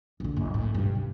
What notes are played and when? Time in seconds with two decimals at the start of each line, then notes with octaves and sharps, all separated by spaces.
0.20 A#1 D3
0.36 F#1
0.54 A2
0.75 G2 C3
0.95 C#2